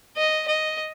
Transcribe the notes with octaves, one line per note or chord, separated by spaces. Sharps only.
D#5
D#5